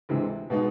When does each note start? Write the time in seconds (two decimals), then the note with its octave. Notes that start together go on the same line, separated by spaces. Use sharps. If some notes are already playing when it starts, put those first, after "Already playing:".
0.09 D2 C3 E3 G#3
0.50 B2 G#3 B3 D#4